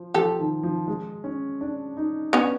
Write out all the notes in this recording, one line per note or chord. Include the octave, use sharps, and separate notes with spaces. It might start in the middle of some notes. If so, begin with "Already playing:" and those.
Already playing: F3
F3 G4 A4
D#3
F3
G#3
C#4
D4
D#4
B3 C#4 D4